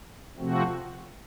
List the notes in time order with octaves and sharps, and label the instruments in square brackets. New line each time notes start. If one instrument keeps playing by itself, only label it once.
[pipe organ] C3 F3 A3 C4 F#4